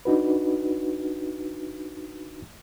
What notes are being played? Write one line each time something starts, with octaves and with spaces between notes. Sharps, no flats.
D4 D#4 F#4 B4